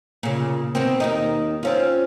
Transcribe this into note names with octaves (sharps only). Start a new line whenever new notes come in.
A#2 C#3
B2 D#3 C4
D#2 D#3 D#4
C4 C#4 F4